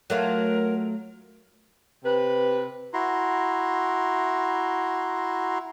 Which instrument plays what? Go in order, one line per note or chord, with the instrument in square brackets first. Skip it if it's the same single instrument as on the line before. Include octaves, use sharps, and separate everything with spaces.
[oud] F#3 A3 F4 [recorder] A#4
[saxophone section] C3 B4
[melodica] E4 F#4 A#5 C6